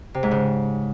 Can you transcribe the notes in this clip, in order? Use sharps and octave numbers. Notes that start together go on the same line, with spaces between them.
C3
G#2
C#3